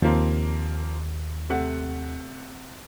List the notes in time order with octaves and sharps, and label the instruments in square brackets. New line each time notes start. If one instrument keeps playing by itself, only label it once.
[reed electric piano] D#2 [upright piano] F3 A#3 C4
[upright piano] C3 A3 F#5